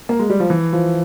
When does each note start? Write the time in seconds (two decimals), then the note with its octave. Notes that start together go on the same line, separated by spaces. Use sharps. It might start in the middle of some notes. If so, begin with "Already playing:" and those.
0.09 A#3
0.19 G#3
0.30 G3
0.40 F3
0.50 E3
0.73 F3